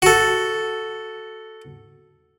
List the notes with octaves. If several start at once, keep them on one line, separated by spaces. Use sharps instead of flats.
F#4 A4